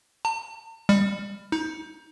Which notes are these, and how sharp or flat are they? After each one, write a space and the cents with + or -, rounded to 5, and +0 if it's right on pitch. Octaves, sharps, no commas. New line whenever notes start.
A5 +45
G3 +30
D#4 +30